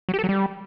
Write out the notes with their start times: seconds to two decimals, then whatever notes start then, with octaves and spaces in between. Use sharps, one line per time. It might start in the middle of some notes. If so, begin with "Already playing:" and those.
0.09 F#3
0.14 G4
0.19 A4
0.24 F#3
0.29 G3